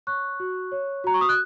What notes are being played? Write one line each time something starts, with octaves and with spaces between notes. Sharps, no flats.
C#5 C#6 F#6
F#4
C#5
F#4 A#5
C#6
D#6
F#6